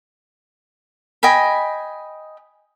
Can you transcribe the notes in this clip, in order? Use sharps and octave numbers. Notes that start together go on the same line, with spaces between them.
D#5 G5 G#5 B5